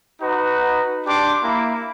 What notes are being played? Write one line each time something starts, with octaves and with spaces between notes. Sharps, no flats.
D#4 F#4 B4
D4 G4 C6 D6
A#3 E4 B5